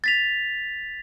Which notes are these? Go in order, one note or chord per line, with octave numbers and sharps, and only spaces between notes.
A6 B6 F7